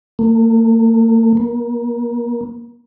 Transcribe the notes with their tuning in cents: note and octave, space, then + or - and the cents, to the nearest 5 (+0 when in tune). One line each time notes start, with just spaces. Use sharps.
A#3 -45
A#3 +30